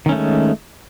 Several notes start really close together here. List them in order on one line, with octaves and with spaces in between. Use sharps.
D#3 C#4 A3 G#3